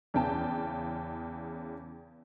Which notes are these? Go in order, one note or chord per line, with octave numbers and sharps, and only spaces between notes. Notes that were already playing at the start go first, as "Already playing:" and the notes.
E2 C#3 G5 A5